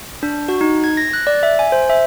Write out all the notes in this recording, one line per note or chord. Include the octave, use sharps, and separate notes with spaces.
D4
F#4
D#4
G#6
A#6
F#6
D5
E5
G#5
C5
E5